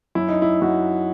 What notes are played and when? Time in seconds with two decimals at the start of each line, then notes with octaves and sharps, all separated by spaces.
0.15 F#2 E4
0.28 D#4
0.42 E4
0.62 F#2 F#4